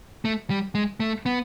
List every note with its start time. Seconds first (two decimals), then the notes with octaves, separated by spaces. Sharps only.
0.25 A3
0.50 G3
0.75 G#3
1.00 A3
1.26 B3